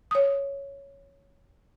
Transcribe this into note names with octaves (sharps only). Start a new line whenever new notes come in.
C#5 D#6